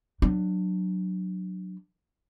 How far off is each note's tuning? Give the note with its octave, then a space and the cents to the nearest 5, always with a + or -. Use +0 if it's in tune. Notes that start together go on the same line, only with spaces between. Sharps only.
F#3 +0 D4 +25